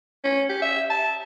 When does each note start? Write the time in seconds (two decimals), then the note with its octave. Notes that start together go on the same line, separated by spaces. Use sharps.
0.24 C#4
0.49 G4
0.62 E5
0.90 A5